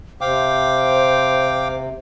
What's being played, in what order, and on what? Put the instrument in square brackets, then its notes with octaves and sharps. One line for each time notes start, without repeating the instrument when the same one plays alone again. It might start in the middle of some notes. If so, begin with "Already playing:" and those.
[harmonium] C3 [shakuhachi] C5 [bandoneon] F5 G5 D6